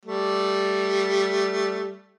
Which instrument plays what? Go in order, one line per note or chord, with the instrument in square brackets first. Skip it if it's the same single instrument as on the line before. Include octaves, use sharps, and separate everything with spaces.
[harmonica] G3 A3